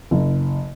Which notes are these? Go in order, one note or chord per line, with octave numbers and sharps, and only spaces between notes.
F#1